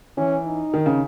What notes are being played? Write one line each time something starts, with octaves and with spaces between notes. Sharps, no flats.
E3 C#4
D#4
D#3
C#3